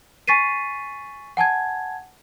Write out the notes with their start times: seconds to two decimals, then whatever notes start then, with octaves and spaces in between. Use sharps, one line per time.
0.28 G#5 C#6 A6 B6 C7 D#7
1.37 F#5 G#5 A5 G#6